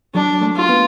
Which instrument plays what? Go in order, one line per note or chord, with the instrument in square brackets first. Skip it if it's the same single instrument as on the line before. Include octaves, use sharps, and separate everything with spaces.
[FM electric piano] F#3 [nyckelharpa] D4
[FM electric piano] A3
[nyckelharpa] F4
[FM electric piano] B3